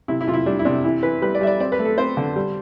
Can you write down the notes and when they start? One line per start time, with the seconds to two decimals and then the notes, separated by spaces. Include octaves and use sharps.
0.08 C3 E4
0.21 E4
0.28 C3 F4
0.34 E4
0.46 G3 D4
0.59 E4
0.65 C3 D4
0.84 E3 E4
1.03 E3 B4
1.22 G3 B4
1.35 D5
1.41 G3 E5
1.47 D5
1.60 C4 D5
1.72 B4
1.79 A3
1.85 A4
1.98 C4 C5
2.17 D3
2.36 G3